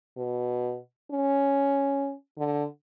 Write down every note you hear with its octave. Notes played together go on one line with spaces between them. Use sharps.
B2
C#4
D3